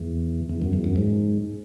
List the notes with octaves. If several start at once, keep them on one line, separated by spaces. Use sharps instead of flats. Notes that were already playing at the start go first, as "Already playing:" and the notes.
Already playing: E2
E2
F#2
E2
F#2
G#2